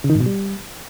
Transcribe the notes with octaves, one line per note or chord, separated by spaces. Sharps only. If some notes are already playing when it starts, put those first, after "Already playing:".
C#3
D#3
G#2
B2
G3